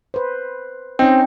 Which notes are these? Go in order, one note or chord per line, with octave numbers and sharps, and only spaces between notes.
B4 C5
C4 C#4 D#4 D#5 G5